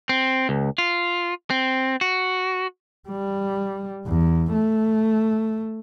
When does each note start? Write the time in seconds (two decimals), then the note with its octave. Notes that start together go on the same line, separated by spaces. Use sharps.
0.09 C4
0.49 C#2
0.78 F4
1.50 C4
2.01 F#4
3.09 G3
4.06 E2
4.53 A3